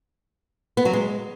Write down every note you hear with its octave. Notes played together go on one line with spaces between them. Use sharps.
B3
F#3
G#3